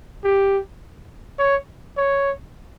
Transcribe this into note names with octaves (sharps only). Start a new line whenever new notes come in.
G4
C#5
C#5